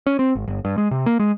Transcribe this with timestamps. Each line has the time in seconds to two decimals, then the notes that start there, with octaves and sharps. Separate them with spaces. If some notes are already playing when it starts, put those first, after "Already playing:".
0.06 C#4
0.19 C4
0.35 G#1
0.48 G1
0.65 G2
0.78 G#3
0.91 C3
1.06 A#3
1.20 G#3